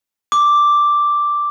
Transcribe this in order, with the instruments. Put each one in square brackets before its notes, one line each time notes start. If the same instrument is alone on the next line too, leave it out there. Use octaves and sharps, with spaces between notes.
[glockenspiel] D6